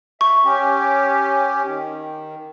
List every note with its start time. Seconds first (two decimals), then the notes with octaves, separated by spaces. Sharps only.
0.21 E5 C#6
0.44 C#4 G4
1.65 D#3